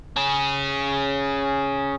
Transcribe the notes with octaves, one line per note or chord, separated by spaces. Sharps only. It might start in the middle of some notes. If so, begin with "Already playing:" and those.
C#4 G#4